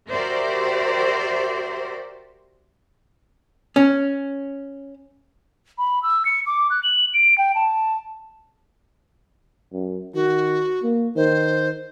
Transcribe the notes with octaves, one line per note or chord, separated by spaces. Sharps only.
F#4 G4 A#4 C5 D5 E5
C#4
B5
E6
C#7
D6
F#6
F#7
D7
G5
A5
F#2
D#3 F#4
A#3
D#3 C5